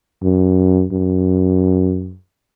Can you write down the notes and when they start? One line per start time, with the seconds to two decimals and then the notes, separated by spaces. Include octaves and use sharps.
0.23 F#2
0.92 F#2